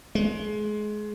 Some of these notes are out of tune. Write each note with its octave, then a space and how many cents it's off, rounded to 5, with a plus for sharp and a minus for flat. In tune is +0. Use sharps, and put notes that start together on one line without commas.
G#3 +25